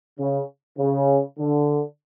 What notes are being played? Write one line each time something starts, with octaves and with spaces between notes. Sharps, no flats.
C#3
C#3
D3